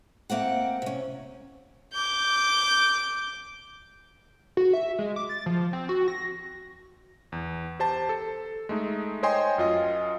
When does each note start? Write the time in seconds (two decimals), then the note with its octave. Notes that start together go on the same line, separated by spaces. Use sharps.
0.30 A3 A#3 C4 F#5
0.82 C3 C#4
1.93 D6 G6
4.57 F#4
4.73 E5
4.99 G#3
5.16 D6
5.29 A6
5.46 F3
5.73 C4
5.89 F#4
6.08 A#6
7.32 E2
7.79 G4 C5 A5
8.09 A4
8.69 G#3 A3 D#4
9.23 C5 C#5 D#5 G5 G#5 C6
9.58 F#2 F4 D#5